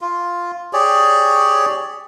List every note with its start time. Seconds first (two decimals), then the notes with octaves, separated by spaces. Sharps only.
0.01 F4
0.73 G4 G#4 C#5 D5